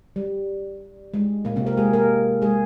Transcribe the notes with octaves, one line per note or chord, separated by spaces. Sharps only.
G3
G#3
A#2 A#3
C3 C4
A#3 A#4
G#3 G#4
A#3 A#4
G#3 G#4